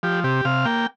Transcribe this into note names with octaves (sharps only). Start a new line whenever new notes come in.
F3 G4
C3 G4
C3 F5
A#3 G5